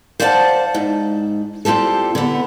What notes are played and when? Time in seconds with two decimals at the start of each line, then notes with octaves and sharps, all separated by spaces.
0.20 C5 D5 F5 F#5 G#5 A5
0.74 G#2
1.65 G3 C4 F4 G4 A4
2.15 D3 B3